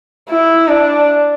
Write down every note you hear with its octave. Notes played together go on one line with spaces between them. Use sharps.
E4
D4